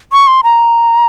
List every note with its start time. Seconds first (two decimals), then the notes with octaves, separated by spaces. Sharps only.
0.12 C#6
0.27 C6
0.44 A#5